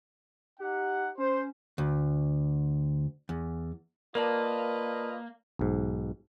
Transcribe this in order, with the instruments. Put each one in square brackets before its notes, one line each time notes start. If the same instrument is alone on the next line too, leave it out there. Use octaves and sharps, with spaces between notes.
[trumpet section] D#4 F#5 [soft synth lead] G4
[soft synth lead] C#4 [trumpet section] C5
[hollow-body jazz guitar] D2
E2
[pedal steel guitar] A#3 [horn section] F4 B4 D#5 [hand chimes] A#4 D5 A5
[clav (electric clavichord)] B1 G#2